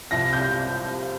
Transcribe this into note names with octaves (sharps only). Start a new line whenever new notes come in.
C2 C3 F3 A#6
G6